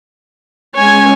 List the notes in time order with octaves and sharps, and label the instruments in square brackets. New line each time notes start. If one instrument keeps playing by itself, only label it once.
[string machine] G#3 C#4 [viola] C#5 G#5